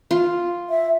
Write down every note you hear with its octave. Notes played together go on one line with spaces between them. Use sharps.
F4
E5